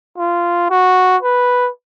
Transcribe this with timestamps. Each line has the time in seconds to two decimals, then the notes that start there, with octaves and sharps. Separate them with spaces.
0.18 F4
0.70 F#4
1.22 B4